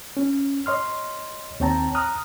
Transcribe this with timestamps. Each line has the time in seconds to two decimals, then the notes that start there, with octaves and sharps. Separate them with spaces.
0.17 C#4
0.66 C#5 D#5 C6 F6
1.60 D#2 C4 C#5 G5 A5 A#5
1.95 A#5 D#6 F6 F#6